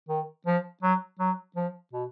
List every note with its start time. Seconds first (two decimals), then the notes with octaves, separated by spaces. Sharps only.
0.09 D#3
0.47 F3
0.83 F#3
1.20 F#3
1.56 F3
1.93 B2